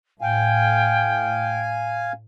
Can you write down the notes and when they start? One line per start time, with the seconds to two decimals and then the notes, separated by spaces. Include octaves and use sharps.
0.21 A2 F5 G5 G#5